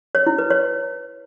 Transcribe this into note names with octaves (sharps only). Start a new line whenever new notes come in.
C#5
E4
B4
C#5